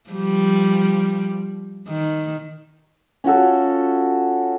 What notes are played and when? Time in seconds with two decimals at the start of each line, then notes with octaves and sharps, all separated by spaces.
0.10 F3 G3
1.87 D#3
3.24 C#4 F4 F#4 A4